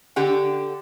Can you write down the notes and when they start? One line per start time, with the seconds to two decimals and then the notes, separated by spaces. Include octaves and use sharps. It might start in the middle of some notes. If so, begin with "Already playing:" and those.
0.16 D3 G4 F#5